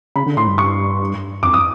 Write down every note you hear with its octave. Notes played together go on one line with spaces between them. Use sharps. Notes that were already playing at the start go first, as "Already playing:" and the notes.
C#3 B5
D3
A2 C6
G2
C#6
F2 D6
D#6